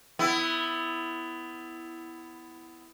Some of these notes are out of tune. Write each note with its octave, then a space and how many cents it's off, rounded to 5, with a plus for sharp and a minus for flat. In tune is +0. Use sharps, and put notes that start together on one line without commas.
B3 +20 E4 +0